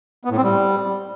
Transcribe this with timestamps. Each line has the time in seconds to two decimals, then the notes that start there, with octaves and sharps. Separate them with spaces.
0.25 B3
0.31 A2
0.37 C4
0.43 G3